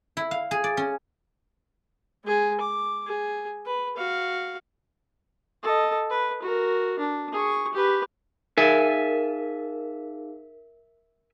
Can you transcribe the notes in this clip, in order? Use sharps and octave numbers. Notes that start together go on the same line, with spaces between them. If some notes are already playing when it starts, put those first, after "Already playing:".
E4
F5
G#4
D5
C#4
G#3 G#4
D6
G#4
B4
F#4 F5
A4 D#5
B4
F#4 A#4
D4
G#4 C#6
G4 B4
D#4 G#4 A#4 E5 F5 G#5